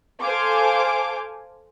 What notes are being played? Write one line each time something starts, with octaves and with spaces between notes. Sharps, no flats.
A4 C5 F5 G#5 D6